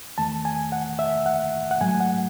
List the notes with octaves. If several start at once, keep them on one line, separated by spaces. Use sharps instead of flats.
E2 D#3 A3 A5
G#5
F#5
E5
F#5
F#5
G#2 F#3 A3 G#5
F#5